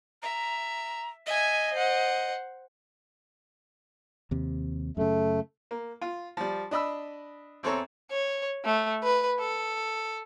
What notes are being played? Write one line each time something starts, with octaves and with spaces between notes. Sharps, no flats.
E5 A#5
D#5 E5 G#5
C5 F#5
D#2 C3
F#2 C#3 A3
A#3
F4
F3 G3
D4 D#5 B5 E6
E2 C4 A4 C#5 A#5
C#5
A3
B4
A4